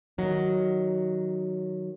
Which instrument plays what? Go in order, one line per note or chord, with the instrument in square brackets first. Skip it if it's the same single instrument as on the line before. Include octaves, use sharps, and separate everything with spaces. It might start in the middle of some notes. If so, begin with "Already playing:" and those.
[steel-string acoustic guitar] D#3 F#3